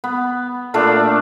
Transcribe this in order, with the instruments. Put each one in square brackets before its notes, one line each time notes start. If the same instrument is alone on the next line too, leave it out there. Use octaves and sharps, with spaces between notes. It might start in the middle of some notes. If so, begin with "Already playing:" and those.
[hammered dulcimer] B3
A#2 A3 D4 A4